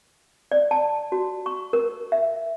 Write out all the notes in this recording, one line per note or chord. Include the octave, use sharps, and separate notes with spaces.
D5
A5
F#4
C#6
A#4
E5